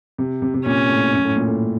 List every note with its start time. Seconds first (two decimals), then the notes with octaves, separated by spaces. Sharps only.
0.18 C3
0.42 C3
0.54 C3
0.65 A#2 C#4
0.89 A2
1.13 F#2
1.25 A2
1.36 A#2
1.48 A2